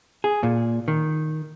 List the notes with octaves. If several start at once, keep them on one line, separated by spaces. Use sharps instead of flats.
G#4
A#2
D#3